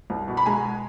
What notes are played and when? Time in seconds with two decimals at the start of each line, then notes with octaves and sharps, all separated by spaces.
0.10 C2
0.28 B2
0.37 B5
0.46 G#3 G#5 A#5